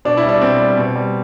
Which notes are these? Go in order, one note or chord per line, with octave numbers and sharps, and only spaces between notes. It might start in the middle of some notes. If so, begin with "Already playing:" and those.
B2 D4
E4
G3
D4
B2 C4
G3
B2
G3